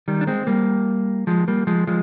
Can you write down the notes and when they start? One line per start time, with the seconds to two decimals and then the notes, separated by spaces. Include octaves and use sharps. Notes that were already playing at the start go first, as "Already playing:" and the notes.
0.08 D#3 G3
0.21 D4
0.27 G#3 C4
0.47 G3 A#3
1.27 F3 G#3
1.48 G3 A#3
1.67 F3 G#3
1.87 F3 G#3